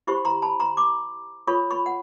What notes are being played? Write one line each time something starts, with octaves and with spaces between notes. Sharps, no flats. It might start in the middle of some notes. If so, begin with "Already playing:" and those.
E4 G4 C5 B5 C#6
A#5 C6
A5 B5
A#5 C6
C6 D6
F4 A4 C#5 B5 C#6
B5 C#6
F#5